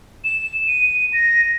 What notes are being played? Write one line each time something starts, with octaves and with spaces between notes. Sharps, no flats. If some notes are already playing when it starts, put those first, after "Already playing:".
E7
D#7
A#6